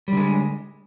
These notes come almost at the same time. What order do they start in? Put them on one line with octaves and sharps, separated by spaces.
G3 D3 G#3